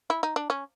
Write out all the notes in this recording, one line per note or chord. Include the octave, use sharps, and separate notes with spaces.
E4
D#4
D4
C#4